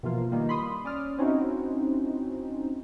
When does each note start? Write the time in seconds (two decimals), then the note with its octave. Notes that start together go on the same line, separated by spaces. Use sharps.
0.03 B2 E3 F3 A#3 F4
0.32 D#3 G3 A#3
0.49 B5 C6 D#6
0.85 C#4 D5 D#6 F6
1.18 C4 C#4 D#4 E4 F#4